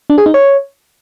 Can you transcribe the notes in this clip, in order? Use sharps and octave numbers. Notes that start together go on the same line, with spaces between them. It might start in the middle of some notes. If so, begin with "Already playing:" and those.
D4
G#4
D#4
C#5